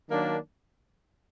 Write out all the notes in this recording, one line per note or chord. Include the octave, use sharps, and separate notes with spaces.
D#3 F#3 A#3 D4